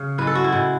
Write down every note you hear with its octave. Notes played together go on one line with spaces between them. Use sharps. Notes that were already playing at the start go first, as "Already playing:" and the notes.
Already playing: C#3
A2 G#3 B4
A4
F#4
E4
A2 G#3